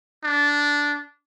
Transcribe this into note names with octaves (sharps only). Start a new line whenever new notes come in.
D4